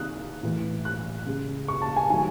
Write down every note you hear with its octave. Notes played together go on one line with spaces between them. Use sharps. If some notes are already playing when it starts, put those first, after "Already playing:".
Already playing: C3 D#3 G#3 D#6 F#6
A2 E3 A3
F#6
C#3 G#3
C#6
A5
G#5
D#3 F#3 A3 G#5